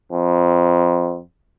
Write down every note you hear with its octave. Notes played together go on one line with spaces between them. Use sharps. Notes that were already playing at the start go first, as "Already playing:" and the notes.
F2